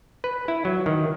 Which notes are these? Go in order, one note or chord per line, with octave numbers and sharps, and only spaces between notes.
B4
E4
F#3
D#3